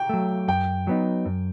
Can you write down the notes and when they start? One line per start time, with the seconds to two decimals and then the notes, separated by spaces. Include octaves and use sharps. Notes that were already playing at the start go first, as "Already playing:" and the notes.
Already playing: G5
0.09 F#3 A3
0.48 F#2 G5
0.87 F#3 B3 D#4
1.26 F#2